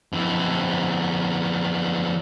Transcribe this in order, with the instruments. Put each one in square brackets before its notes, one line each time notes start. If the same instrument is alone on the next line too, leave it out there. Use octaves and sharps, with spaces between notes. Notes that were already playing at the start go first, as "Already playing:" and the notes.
[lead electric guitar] F2 E3